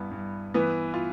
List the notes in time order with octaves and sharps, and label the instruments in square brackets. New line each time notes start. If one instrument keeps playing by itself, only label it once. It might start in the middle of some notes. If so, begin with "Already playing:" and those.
Already playing: [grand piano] G2 E3 B3
G2
[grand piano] E3 [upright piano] B3 B4
[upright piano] F4